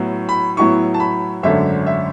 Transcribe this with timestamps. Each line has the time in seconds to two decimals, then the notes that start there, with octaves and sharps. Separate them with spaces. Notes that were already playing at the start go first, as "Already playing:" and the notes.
Already playing: A2 F#3 B3 E4
0.29 B5
0.57 A2 F#3 B3 E4 C#6
0.94 A5
1.00 B5
1.43 G#1 F#2 D3 A3 C#4 E5
1.86 E5